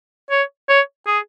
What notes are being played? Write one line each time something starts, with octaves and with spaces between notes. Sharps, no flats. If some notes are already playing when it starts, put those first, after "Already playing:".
C#5
C#5
G#4